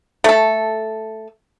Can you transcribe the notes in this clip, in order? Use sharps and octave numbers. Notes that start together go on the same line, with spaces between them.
A3 A4